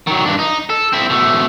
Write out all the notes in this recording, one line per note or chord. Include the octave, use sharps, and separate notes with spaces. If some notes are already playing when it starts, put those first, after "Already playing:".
D#3 F#3
G2 D4
D#4
A4
C4 E4
B2 A3